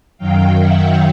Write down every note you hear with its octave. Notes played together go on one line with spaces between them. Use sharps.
F#2 D#3 F#3 F5 G5
E5 F#5